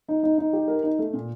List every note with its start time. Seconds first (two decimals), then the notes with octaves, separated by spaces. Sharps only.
0.08 D#4
0.23 D#4
0.38 D#4
0.53 G4
0.68 A#4
0.84 D#4
0.99 A3
1.14 A#2